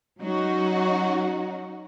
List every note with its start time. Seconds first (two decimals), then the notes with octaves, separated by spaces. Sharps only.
0.20 F#3 C#4 D#4 F#4